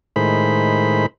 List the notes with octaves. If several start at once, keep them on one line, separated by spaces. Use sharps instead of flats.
A2 D#3 G#3 C5 B5